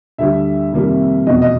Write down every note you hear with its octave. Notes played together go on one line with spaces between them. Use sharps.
D2 D3 G3 E5
F2 C3 D#3 G3 A#3
F1 E2 B2 D#5
D#5